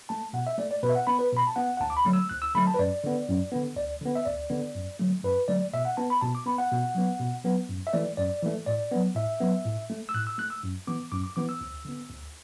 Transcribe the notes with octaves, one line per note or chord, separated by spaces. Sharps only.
A3 A5
B2 F#5
E5
A3 D5
D5
B2 B4
E5
F#5
B3 B5
B4
B2 B5
A5
B3 F#5
F#5
D2 A5
D6
B5
D3 F#3 A3
E6
D2 F#6
E6
D3 F#3 A3 B5
A5
B4
F#2 D5
D3 B3
F#2
D3 B3
D2 D5
D3 B3
E5
D2 D5
D3 B3
F#2
D3 F#3 A3
F#2 B4
D3 F#3 A3 D5
B2 E5
F#5
B3 A5
B5
B2 A5
D6
B3 B5
F#5
B2
F#3 B3
B2
F#3 B3
F#2
E5
E3 A3 D5
F#2 D5
E3 A3
A2 D5
F#3 B3
A2 E5
F#3 B3
A2
A3
E6
A2 F#6
E6
A3 F#6
E6
F#2
E3 B3 D6
F#2 D6
D6
E3 B3 D6
E6
D2
D3 B3
D2